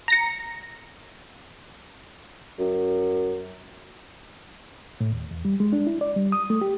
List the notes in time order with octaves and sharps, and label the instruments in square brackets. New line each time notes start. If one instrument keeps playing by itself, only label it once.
[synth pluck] A#5 A#6 C#7
[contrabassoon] F#2
[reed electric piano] A2
D#2
E2
G3
G#3
D4
E4
D5
G3
D#6
A3
G4